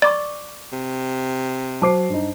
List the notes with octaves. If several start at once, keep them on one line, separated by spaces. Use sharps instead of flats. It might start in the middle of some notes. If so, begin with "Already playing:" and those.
D5 C#6 D6 E6 A6
C3
F#3 C5 A5 D6 C7
G2 D#4